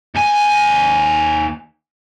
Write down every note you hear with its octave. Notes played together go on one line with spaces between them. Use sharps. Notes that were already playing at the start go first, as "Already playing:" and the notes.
D#2 G#5